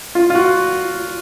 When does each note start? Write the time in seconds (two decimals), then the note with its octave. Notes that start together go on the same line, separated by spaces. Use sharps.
0.15 F4
0.30 F4
0.35 F#4